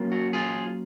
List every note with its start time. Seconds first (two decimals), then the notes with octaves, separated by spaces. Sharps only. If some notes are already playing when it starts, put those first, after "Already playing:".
Already playing: F#3 A#3 C#4 F4
0.12 F#4
0.33 F4 G#4